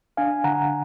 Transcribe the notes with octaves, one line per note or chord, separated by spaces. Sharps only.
D4 F5 G#5
D3 F#5 A#5